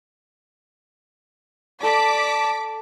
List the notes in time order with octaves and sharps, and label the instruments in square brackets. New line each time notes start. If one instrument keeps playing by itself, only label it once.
[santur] A4 [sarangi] D5 [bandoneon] A5 [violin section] D6 B6